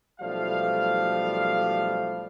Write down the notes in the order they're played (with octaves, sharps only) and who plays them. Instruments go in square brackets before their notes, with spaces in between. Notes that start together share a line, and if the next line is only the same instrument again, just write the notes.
[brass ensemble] B1 F3 G3 A3 F5